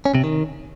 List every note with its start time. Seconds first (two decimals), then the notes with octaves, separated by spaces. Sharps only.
0.05 C#4
0.15 C3
0.24 D#3